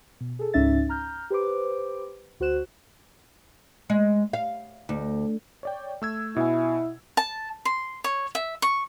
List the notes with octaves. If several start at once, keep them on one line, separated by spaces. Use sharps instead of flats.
B2
G#4 A4
C#2 G#2 C#4 D#4 E5 A6
A#5 F6 G6
G4 B4 C5 D6
D2 F#4 C5 F#6 E7
G#3
F5
D2
C#5 D5 G5
A3 E6 G#6
B2 E4 G#5
A5
C6
C#5
E5
C#6